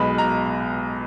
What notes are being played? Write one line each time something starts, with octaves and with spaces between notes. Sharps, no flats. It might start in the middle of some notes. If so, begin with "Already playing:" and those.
Already playing: B1 B2 G#3 B5
A#5